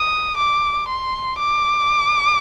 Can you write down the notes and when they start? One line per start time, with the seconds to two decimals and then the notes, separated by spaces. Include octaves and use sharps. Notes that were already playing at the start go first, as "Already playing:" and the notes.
Already playing: D#6
0.37 D6
0.89 C6
1.39 D6